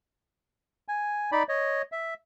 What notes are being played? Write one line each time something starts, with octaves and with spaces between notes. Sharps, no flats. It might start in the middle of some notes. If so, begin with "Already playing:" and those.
G#5
D#4 D5 B5
C#5 D#5
E5